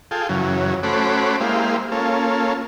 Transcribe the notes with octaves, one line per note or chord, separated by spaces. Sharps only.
F4 G#4 A4 G5
F#2 C#3 E3 F#3
A3 C#4 F#4 C5 B5 D6
G#3 A#3 E4 G4 C5 F5
A#3 C#4 F4 A4